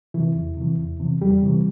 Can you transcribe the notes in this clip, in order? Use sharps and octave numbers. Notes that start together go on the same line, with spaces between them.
C3 E3 E4
E2
C3 E3
E2
C3 E3
E2 G3 G4
C3 E3